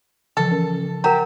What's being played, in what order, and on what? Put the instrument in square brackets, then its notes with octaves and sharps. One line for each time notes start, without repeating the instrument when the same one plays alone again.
[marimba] C#3 E3 F3 [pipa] A4
[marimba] C#4 A#4
[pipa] G4 [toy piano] A#4 A#5 [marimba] F#5